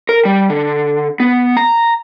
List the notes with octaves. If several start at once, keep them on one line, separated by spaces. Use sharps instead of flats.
A#4
G3
D3
B3
A#5